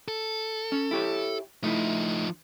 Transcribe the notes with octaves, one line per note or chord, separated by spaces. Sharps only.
A4
C#4
E4 G4 C#5
F3 A3 D#4 E4